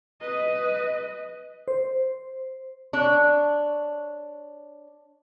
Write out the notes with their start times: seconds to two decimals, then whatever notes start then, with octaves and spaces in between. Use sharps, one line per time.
0.21 B4 D#5
1.68 C5
2.93 D4 C#5